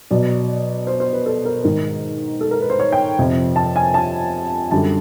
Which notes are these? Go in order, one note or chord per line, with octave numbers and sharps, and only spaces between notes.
B2 F#3 D5
C5
C5
B4
A4
A#4
G#2 D#3 G#3 A#4
A4
A#4
B4
C5
C#5
G5
F2 C3 F3
A5
G#5
A5
F#2 D3 G3 A5